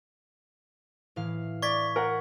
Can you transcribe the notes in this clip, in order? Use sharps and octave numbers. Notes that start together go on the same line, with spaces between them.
A2 E3 F5
D5 C#6 G#6 B6
A#4 F#5